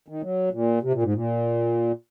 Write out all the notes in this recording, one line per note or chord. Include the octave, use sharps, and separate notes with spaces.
D#3
F#3
A#2
C3
A#2
G#2
A#2